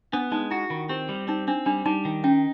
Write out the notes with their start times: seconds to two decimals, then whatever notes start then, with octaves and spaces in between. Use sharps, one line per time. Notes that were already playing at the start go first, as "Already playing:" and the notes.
0.13 B3 D4
0.32 G#3 D#4
0.51 E4 F#4
0.70 D#3 F4
0.89 C4 G4
1.09 G3
1.28 C4 D#4
1.48 C4 D4
1.66 G3 D4
1.86 G3 D#4
2.05 D#3
2.24 C#4 D#4